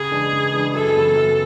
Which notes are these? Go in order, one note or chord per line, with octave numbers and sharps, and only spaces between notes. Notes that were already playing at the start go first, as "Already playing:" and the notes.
Already playing: C#3 G#4
E3 G#3 D4
C#3
E3 G#3 D4
F#2 A4
C#3 E3 B3
F#2